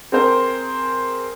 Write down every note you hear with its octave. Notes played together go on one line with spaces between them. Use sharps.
C4 G#4 A#4 C5